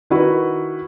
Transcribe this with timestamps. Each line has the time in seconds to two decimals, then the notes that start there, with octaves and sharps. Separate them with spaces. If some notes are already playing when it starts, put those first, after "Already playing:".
0.10 D#3 E4 F#4 B4